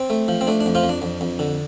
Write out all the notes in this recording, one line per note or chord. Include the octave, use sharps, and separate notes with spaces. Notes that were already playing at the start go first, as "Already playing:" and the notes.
Already playing: C4
A3
F3
C4
A3 D4
D4
F2
F3 F4
F2
D4
F2
F2
D3